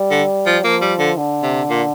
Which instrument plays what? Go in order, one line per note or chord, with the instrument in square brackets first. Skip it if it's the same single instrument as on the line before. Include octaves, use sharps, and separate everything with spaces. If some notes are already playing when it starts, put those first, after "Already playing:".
Already playing: [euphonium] G3
[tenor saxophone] D3
F3
[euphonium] F3 [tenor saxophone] A#3
[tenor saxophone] G3
D3
[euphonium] D3
[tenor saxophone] C3
A#2